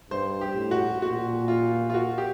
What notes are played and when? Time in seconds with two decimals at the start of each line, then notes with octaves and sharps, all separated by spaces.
0.10 G2 C5
0.41 G4
0.56 A2
0.71 F#4
1.02 A#2 F#4
1.48 F4
1.90 F4
1.94 F#4
2.18 G4